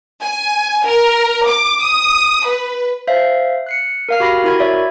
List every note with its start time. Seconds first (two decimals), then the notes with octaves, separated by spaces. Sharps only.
0.21 G#5
0.85 A#4
1.46 D6
1.82 D#6
2.45 B4
3.07 C5 E5 F5
3.66 F#6 C7 C#7
4.09 A#4 F5 F6
4.20 F#4 G4 B5 A#6 C7
4.44 E4 F#4 A#4 B5 C6 G#6
4.60 C#5 D5 E5